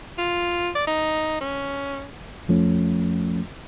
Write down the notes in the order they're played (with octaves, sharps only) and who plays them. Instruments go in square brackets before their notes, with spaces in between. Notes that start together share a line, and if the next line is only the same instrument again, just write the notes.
[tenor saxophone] F4
D5
D#4
C#4
[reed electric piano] F2 F3 A3 C#4